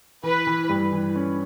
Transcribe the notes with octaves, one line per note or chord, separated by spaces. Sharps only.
E3 B4
E3
G2
E3
C#4